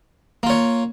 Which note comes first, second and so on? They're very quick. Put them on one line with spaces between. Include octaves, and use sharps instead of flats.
A#3 F4 C#5